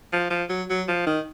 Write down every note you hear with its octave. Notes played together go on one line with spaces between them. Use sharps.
F3
F3
F#3
F#3
F3
D#3